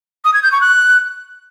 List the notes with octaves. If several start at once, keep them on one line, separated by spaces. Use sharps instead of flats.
D#6
G#6
G6
C#6
F#6